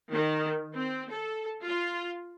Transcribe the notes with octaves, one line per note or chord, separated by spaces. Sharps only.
D#3
C4
A4
F4